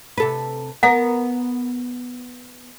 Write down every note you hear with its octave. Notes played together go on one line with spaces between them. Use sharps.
C3 A4 B4
B3 A#4 F#5